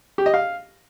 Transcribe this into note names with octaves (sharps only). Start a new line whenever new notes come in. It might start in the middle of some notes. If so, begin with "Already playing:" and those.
G4
D#5
F5